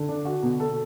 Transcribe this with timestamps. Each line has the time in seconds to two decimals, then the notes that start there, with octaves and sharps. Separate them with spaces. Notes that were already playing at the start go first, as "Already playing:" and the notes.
Already playing: D3
0.08 D4
0.25 F#4
0.43 B2
0.60 A4